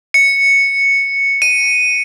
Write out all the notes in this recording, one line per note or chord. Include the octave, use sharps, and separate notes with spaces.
C#7
D#7